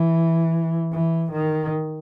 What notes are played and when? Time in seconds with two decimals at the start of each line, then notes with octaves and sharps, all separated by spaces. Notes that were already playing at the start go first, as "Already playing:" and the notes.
Already playing: E3
0.93 E3
1.32 D#3